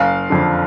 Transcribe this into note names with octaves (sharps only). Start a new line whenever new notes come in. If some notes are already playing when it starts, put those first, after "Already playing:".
Already playing: F#1 F5
F2 D3